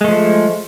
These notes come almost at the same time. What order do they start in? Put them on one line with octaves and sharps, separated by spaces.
G#3 A3 F3